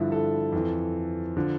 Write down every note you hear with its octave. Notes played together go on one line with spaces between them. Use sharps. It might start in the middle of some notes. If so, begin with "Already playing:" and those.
Already playing: G2 D3 F3 E4
A4
F2 E3
D3 F3